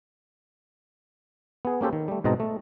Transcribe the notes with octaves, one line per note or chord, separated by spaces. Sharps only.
B3 G#4
A#3 C#4 G4 A4 C5
D#3
G3 A3
G#2 B2 C4 D#5 A5 A#5
A3